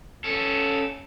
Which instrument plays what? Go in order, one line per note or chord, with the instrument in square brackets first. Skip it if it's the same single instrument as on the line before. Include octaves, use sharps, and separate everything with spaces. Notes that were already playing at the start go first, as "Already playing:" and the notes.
[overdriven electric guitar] C#4 A4